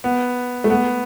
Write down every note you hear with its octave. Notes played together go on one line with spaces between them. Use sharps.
B3
A3
B3